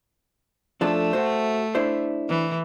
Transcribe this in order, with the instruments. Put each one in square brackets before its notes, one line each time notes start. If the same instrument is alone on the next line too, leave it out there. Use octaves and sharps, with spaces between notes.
[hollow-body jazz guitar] F3 D4 A4 [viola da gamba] A3
[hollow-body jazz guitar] F#4 C5
D4 E4 C5
[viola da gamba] E3